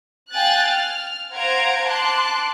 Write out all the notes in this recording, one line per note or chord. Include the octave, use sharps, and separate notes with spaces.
F5 G5 G#5 F#6 A6
F6
C5 F5 F#5 A#5 G#6 D7
A5 C6 D6 F#6